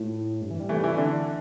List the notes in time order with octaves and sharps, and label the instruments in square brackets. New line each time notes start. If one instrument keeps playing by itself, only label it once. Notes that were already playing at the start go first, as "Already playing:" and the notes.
Already playing: [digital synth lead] A2
G2
E3
G3
[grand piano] E3 A3
E3
[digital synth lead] E4
[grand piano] D3 [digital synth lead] D4